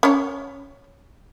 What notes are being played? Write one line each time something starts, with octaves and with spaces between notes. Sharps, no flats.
C#4 C#5